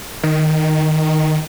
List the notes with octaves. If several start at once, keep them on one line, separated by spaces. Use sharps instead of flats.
D#3